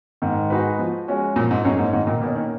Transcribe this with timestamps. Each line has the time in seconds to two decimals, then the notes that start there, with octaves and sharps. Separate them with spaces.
0.22 G#2 D#3
0.50 G#3 D#4 F#4 B4
0.79 F3
1.07 G#3 C#4 F#4
1.36 A#2 F3
1.51 G#2
1.64 F#2 A#3 D#4 G#4 C#5
1.79 G#2
1.93 G#2 D#3
2.07 A#2
2.21 B2 A#3
2.26 C#4
2.35 D#3